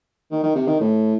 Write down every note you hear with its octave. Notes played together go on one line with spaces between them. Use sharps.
D#3
D#3
C3
D#3
A2